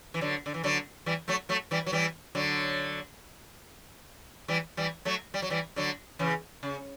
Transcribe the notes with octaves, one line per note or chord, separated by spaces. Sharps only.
E3
D3 F#3
D3
E3
D3 F#3
E3 G3
F#3 A3
F#3 A3
E3 G3
F#3
E3 G3
D3 F#3
E3 G3
E3 G3
F#3 A3
G3
F#3
E3 G3
D3 F#3
C#3 E3
C#3